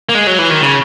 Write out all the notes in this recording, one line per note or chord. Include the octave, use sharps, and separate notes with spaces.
A#3
G#3
F#3
E3
D#3
C#3